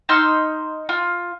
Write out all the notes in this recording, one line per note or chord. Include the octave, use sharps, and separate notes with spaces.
D#4 C6 E6 F6
F4